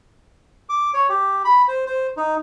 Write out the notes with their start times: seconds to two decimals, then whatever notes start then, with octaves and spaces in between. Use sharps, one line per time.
0.69 D6
0.94 C#5
1.09 G4
1.45 B5
1.68 C5
1.86 C5
2.17 D#4